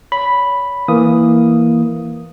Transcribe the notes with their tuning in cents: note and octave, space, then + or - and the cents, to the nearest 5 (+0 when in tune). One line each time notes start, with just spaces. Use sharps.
C#5 +30 B5 +0
E3 +0 A#3 +0 D#6 +0